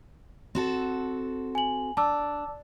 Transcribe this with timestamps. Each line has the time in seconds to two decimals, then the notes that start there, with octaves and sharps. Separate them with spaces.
0.55 C4 F#4 A4
1.55 G#5 F#7
1.97 D4 A5 D6 E6